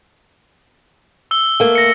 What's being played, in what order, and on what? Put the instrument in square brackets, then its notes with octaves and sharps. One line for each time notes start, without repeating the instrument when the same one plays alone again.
[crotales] E6 G7
[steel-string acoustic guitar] A3 A#3
[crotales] A#6 C#7